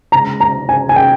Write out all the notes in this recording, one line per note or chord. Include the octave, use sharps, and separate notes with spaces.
C#3 G#3 A#5
A#5
G#5
G#5
G5